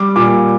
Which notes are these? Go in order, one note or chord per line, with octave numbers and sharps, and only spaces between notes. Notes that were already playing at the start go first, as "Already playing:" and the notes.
Already playing: G3 D6
A#2 D6